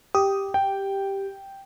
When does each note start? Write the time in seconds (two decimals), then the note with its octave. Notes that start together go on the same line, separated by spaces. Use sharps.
0.15 G4 D#6
0.54 G5